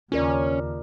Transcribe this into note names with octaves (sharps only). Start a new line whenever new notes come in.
D#2 C#3 C#4 F4 A#4 D5